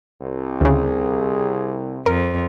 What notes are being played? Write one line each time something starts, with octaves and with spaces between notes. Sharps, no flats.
C2
D2 C#3 G#4
F2 A#4